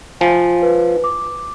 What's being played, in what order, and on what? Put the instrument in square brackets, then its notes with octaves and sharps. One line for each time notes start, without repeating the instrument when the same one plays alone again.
[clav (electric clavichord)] F3 [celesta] G#5
[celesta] B4
D6